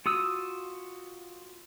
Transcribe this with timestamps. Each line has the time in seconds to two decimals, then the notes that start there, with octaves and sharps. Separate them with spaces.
0.06 F4 F#4 D#6 E6